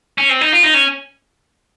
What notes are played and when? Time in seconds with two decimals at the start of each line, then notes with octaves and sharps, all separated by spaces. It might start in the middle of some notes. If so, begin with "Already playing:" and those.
0.18 C#4
0.29 C4
0.41 D#4
0.53 F4
0.63 D#4
0.74 C#4